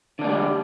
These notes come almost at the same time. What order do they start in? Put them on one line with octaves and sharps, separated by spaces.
D3 D4 A#3 G#3 G3